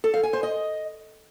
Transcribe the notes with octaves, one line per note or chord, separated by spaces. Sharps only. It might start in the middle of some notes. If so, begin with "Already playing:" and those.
A4
F5
G#5
C5
D#5